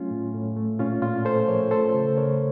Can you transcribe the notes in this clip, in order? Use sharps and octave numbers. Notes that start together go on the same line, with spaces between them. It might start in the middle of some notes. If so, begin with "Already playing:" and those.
Already playing: F#3 A3 C#4 F4
A2
A2
A3
A#2 C#4 F4
A#2 C#4 F4
A3 A4 C5
F3 A#4 C#5
A3 A4 C5
C#3
C#3 A#4 C#5